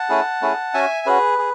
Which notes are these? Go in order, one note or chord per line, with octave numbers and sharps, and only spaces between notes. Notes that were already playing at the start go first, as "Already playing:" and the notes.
Already playing: F#5 A5
A3 C#4 E4 G#4
A3 C#4 E4 G#4
C#4 F#4 E5 G#5
C#4 F#4 G#4 B4
G#4